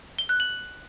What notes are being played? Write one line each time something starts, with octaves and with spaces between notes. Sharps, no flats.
G7
F#6
F#7